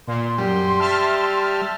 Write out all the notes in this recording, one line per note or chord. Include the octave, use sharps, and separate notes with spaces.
A#2 C6
F#2 G3
E5 A5 F6